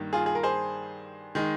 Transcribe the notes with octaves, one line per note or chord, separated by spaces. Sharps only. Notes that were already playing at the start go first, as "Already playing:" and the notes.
Already playing: G2 D#3 A#3
F4 G#4
G#4
A#4
G#4 C5
D#3 G#3